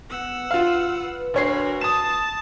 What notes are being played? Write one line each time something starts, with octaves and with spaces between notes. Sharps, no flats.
B3 F#5 E6
F4 B4 F5
D2 F#4 A#4 C#5 C7
A5 D#6 E7